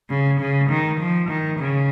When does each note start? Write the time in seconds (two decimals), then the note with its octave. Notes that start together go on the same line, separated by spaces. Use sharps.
0.10 C#3
0.40 C#3
0.70 D#3
1.00 F3
1.29 D#3
1.60 C#3